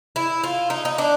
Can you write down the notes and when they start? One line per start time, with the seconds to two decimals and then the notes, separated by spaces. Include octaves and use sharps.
0.16 E4
0.44 F4
0.70 D#4
0.85 D#4
0.98 D4